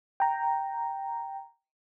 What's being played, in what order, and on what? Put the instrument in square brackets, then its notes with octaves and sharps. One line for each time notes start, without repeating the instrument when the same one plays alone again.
[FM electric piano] G5 A#5